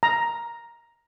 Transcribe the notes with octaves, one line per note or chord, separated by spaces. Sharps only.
A#5